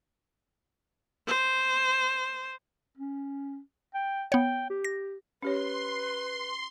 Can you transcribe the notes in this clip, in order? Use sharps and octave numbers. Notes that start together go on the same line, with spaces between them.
C5
C#4
G5
B3 C#5 G5
G4
A#6
C#4 G4 B4 C#5 C6